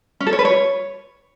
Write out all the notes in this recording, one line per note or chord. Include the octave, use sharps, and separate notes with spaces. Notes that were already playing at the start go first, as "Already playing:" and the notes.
C#4
A4
C#5
B4
C#5